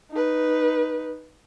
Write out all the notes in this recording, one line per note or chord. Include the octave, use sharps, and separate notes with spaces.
D#4 B4